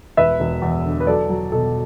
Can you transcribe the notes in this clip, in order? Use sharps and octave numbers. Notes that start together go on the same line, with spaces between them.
E1 B4 E5
E1
E2
D3
B4
F#3 A4 D5
F#3
B2 A4